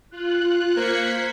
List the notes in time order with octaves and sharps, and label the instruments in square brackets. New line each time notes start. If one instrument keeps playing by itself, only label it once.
[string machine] F4 [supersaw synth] F#6
[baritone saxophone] A#3 [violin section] C5 G#6 C#7 [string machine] B6